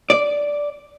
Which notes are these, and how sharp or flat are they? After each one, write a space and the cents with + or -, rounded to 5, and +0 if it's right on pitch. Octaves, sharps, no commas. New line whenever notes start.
D5 -5